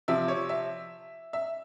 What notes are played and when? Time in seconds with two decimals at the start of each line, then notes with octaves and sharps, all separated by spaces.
0.08 C3 F3 E5
0.28 C#5
0.49 E5
1.33 E5